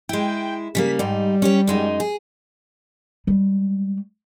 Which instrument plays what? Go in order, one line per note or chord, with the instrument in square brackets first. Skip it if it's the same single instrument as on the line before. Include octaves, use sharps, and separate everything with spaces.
[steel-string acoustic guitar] G#3 E4 [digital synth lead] G5
[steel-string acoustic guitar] C#3 G3 A#3 [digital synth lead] B6
[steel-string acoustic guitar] G#2 D#4 [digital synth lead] G3
[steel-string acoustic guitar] C#4 G4 C#5
F#2 G#3 D#4
G#4
[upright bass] G3 G#3